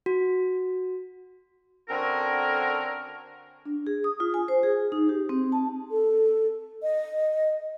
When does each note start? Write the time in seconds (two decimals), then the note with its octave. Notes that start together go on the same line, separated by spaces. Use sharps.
0.06 F#4
1.89 D3 C4 C#4 F#4 A4 A#4
3.66 D4
3.87 G#4
4.04 D#6
4.20 F4
4.34 G#5
4.48 C5
4.63 G#4
4.92 D#4
5.09 G4
5.29 C4
5.52 A5
5.91 A4
6.83 D#5